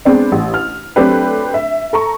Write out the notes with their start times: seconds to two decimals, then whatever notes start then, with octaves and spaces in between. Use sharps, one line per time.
0.05 G#3 B3 C4 D4
0.32 A1
0.54 F6
0.96 F#3 A3 C4 D4 G4 B4
1.54 E5
1.93 A4 A#5 C#6